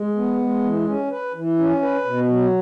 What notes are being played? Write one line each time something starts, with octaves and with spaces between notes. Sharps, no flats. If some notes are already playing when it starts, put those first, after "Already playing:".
Already playing: G#3
B3
G#3
E3
C#4
B4
E3
C#4
B4
B2
F#3